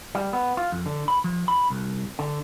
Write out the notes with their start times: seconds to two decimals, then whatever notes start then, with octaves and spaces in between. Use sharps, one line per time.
0.15 G3
0.33 B3
0.57 F4
0.72 F2
0.86 D3
1.08 B5
1.24 F3
1.48 B5
1.70 C2
2.19 D3